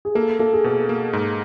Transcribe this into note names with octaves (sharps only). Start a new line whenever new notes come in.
G#4
A#3 A4
A#3 A4
G#4
B2 A4
A#3
G#2